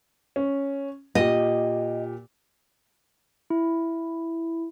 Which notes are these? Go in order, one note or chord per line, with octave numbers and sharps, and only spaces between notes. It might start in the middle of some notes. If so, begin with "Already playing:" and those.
C#4
A#2 G4 D#5
E4